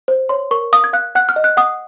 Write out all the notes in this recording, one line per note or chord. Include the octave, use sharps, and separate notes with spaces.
C5
C#5 C6
A#4 C#6
F5 D#6
G#6
F5 F#6
F#5 F#6
F6
D#5
F#6
F#5 D#6